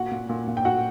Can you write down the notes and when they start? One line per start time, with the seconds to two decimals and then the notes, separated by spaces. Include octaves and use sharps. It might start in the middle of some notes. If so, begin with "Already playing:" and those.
Already playing: A#2 F#4 F#5
0.11 A#2
0.29 A#2
0.48 A#2
0.57 G5
0.65 A#2 F#4 F#5